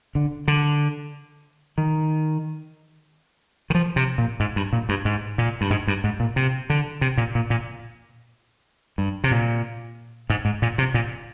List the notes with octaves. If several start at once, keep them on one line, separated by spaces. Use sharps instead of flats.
D3
D3
D#3
D#3
F3
C3
A#2
G#2
G2
A#2
G2
G#2
A#2
G2
G#2
G2
G#2
A#2
C3
D3
C3
A#2
A#2
A#2
G2
C3
A#2
G#2
G#2
A#2
C3
A#2